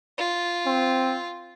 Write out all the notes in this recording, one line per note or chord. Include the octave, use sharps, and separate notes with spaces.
F4
C4